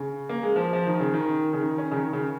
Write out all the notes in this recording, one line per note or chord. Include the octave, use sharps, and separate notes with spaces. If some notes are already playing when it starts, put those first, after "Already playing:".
Already playing: C#3
A#3
G#3
F3
F3
D#3
C#3
D#3
C#3
D#3
C#4
C#3
D#3
C#3